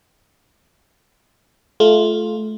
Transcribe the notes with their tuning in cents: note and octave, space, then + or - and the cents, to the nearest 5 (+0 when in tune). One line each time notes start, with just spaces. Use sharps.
A3 -25 F4 +0